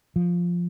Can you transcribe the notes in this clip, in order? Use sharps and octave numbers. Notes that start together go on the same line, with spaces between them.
F3